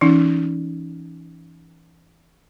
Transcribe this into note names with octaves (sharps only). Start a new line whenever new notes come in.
E3 C#4 D#4